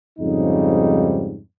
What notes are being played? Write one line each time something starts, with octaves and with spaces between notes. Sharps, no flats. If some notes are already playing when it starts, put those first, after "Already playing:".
F2 G#2 C#3 G3 D#4